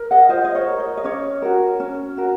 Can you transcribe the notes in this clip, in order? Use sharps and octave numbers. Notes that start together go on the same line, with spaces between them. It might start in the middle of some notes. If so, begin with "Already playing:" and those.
Already playing: A#4
D#5 F#5
F4 C5 D#5
D#5
C#5
A#4
C#5
D#5
C#4 C#5
F#4 A#4
C#4
F#4 A#4